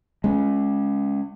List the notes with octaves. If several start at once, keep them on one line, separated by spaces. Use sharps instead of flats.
G#3 C#4